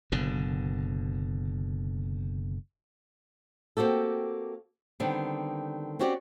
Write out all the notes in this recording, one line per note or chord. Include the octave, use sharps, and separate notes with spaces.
F#1 B2 D3
A#3 C4 F#4 G4 A4
D3 D#3 G3 B3 C4
C4 C#4 F#4 G4 C#5 D5